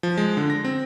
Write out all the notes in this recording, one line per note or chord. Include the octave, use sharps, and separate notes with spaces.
F3
G#3
D3
A#6
C4